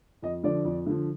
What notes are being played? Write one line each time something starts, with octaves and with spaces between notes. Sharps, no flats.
F2 D#5
D3 F3 D5
F2
D3 F3